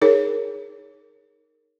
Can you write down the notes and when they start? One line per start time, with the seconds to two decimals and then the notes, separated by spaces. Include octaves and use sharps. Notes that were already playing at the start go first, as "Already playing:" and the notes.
0.02 D#4 G#4 A#4 C#5